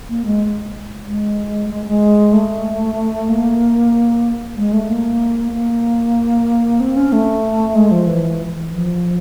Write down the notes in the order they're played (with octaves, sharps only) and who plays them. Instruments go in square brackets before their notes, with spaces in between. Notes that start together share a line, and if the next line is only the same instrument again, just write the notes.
[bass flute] A#3
G#3
G#3
G#3
G#3
A3
A#3
G#3
A3
A#3
A#3
C4
C#4
A3
G#3
F3
E3
F3